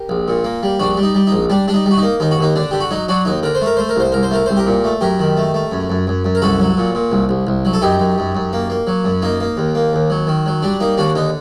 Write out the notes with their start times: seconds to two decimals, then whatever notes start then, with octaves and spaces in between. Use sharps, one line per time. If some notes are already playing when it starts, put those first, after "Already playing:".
Already playing: G4 A#4
0.09 A#1
0.28 A#2
0.44 A#3
0.63 G3
0.80 A#1 D4 F#4
0.97 G3
1.03 D#4
1.15 G3
1.27 D#4
1.32 A#1
1.50 G3 D4
1.68 G3 D4
1.74 D#4
1.86 G3
1.91 F#4
1.98 D#4
2.03 A#3
2.20 D#2 D#4
2.31 F#4
2.39 D#2 D#4
2.56 D3 D4
2.71 D3 G4
2.80 F#4
2.91 F#3 D#4
3.08 F#3 D4 F#4
3.25 D#2 D#4
3.43 D3 A#4
3.55 C5
3.61 A3 A#4
3.77 A3 C5
3.89 A#4
3.96 C2 C5
4.12 C2 A#4
4.23 C5
4.31 A3 A#4
4.46 C2 C5
4.57 G4 A#4
4.66 A#2
4.84 A3
5.01 F#2 G4 A#4
5.19 D#3
5.37 A3
5.54 A3
5.71 F#2
5.90 F#2
6.07 F#2
6.25 F#2
6.35 A#4
6.42 C2 F#4 A4
6.60 F#3
6.77 A#2
6.95 A#2
7.11 C2
7.29 C2
7.47 C2
7.65 F#3
7.73 A4
7.82 F#2 D#4 G4
8.00 F#2
8.18 F#2
8.35 F#2
8.53 A#3
8.70 A#3
8.87 F#3
9.04 F#2
9.22 A#3 D#4
9.40 A#3
9.57 D#2
9.75 A#3
9.93 D#2
10.10 F#3
10.27 D#3
10.46 F#3
10.62 G3 D4
10.80 A#3 D#4
10.97 D#2 D4 F#4
11.16 D3 D#4